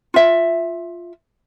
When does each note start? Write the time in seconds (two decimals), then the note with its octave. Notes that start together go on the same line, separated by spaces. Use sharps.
0.14 F4 E5